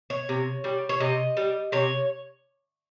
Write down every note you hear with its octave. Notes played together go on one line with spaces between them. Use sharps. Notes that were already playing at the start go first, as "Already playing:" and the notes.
C#5
C3
G3
C#5
C3 D#5
G3
C3 C#5